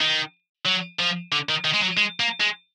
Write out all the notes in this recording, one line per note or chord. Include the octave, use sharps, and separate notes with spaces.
D#3
F#3
F3
D3
D#3
D#3
G#3
F#3
G#3
A#3
G#3